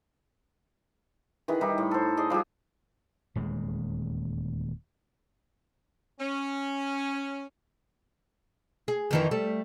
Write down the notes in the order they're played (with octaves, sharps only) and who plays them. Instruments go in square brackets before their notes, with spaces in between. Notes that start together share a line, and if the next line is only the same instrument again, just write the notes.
[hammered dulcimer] D#3 E3 G#4
G3 D#4 E4
A2
A4 C5
G#4 D5 D#5
F3 G3 F#4 G#4
[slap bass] D#1 E2 G#3
[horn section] C#4
[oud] G#4
F2 D#3 E3
G3 A3